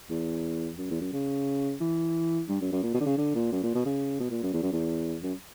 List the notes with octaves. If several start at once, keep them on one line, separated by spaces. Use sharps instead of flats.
E2
F#2
E2
F#2
C#3
E3
G2
F#2
F#2
A#2
B2
D3
C#3
D3
A#2
F#2
A#2
B2
C#3
B2
A#2
F#2
E2
F#2
E2
F#2